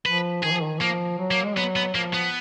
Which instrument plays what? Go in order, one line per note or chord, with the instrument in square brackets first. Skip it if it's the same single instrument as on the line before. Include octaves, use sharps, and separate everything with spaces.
[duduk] F3 [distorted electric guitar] B4
[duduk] D#3 [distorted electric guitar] G#4
[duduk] F3
D#3
[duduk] F3 [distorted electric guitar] A#3
[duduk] F#3
[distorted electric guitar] A#3
[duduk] G#3
[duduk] F#3 [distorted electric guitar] B3
[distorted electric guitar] B3
[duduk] F3 [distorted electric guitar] A#3
[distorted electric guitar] B3